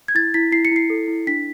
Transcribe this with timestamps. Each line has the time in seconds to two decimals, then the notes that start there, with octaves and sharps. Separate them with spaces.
0.08 G#6
0.15 E4 A6
0.34 E4 B6
0.52 E4 C7
0.65 C#7
0.71 E4 C7
0.90 A4
1.08 E4
1.27 D4 B6